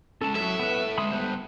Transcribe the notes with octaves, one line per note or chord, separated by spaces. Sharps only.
G#3 C#4 A4 A5
F#3 A4 C#5 E5
B3 B4
D3 G#3 B5 C6 D#6
G3 B3 C5 F#6